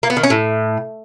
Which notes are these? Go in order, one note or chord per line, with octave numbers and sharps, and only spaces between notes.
A#3
B3
D#3
C#4
A2